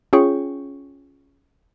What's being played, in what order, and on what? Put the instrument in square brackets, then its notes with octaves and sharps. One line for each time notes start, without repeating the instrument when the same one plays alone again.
[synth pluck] C#4 F4 G#4 C#5 G5 C#6